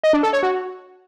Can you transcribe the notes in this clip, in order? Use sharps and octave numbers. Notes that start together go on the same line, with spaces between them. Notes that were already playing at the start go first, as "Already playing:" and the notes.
D#5
D4
A4
C#5
F#4